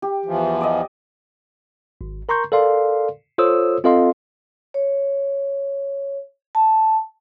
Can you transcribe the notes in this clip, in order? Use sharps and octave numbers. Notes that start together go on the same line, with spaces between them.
G4
E2 E3 F3
D5 D#5
G#1
A#4 A#5 C6 C#6 G6
A4 A#4 D5 F5 C6
F4 A4 C5 C#5 D#6 E6
C4 F4 A4 D#5 F5 C6
C#5
A5